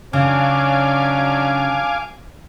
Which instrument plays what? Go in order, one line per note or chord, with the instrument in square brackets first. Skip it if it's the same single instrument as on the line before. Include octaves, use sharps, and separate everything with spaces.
[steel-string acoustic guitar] C#3 [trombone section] F#3 C#4 D4 [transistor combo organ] F5 G#5 D6